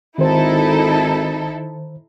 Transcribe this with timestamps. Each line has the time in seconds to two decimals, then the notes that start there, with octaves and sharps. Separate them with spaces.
0.18 G#1 D#3 D#4 E4 A4 C5